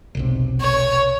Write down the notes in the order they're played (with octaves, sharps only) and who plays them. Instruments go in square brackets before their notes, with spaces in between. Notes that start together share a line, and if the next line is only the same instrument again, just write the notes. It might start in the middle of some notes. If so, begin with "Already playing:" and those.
[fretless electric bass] E1 B1 C3
[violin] C#5